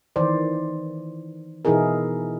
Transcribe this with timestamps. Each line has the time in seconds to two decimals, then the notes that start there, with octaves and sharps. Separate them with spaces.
0.16 D#3 E3 C5 D5
1.65 B2 E3 D#4 E4 G#4 A#4